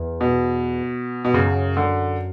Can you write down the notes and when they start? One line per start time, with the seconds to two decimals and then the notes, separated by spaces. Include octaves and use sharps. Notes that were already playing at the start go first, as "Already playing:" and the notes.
Already playing: E2
0.21 B2
1.25 B2
1.34 F#2 C#3
1.77 D3